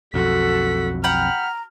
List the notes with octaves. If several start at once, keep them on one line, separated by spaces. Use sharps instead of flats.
B1 F2 F#4 A4 B6
F#5 G5 A#5 B5 F6